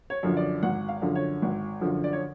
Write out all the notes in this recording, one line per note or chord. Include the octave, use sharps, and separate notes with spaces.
C#5
F#2 D3 F3
D5
G#1 F#5
F5
F#2 D3 F3
C#5
G#1
F#2 D3 F3
D5
C#5